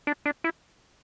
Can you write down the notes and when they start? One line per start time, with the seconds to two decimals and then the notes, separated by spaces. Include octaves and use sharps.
0.07 D4
0.26 D4
0.44 E4